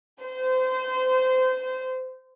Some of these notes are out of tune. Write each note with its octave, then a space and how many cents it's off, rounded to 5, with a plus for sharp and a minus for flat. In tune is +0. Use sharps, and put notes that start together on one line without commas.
C5 -25